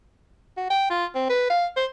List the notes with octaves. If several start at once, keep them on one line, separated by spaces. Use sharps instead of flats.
F#4
G5
F4
C4
B4
F5
C5